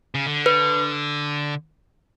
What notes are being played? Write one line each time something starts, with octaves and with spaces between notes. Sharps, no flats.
C#3
D3
B4